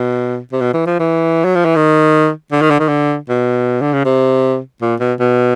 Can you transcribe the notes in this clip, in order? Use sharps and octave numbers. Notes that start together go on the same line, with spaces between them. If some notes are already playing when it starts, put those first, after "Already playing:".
Already playing: B2
C3
B2
E3
F3
E3
F#3
F3
E3
D#3
D3
D#3
D3
D#3
D3
B2
D3
C#3
C3
A#2
B2
B2